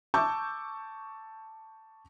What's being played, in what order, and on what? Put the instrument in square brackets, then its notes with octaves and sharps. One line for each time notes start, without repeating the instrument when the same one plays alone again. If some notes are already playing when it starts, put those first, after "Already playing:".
[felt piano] A5 C#6 D6 E6 G6